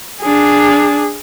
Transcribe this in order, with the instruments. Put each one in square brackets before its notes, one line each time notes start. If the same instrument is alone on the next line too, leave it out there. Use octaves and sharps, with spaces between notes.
[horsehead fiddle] D4 G#4